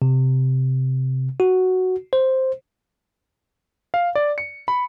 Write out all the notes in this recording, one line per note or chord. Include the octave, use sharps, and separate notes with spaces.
C3
F#4
C5
F5
D5
C#7
B5